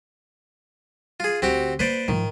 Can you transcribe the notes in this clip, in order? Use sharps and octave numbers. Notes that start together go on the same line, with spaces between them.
F4 G#4
D2 C4 F#4 G4
A#3 B4 C5 D5
G#2 D#3 F3